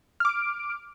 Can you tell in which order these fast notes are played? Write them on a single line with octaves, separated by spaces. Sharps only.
F6 D6 D7